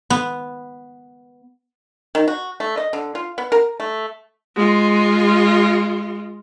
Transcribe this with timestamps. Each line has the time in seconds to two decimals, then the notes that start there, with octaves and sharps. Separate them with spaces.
0.10 B3
2.15 D#3
2.28 F#4
2.60 A3
2.77 D#5
2.93 D3
3.15 F4
3.38 B3
3.52 A#4
3.80 A3
4.56 G#3 F4